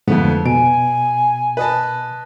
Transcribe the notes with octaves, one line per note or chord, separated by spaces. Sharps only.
F2 G#2 D3 F3 A3 B3
B2 G#5 D7
B4 D#5 A5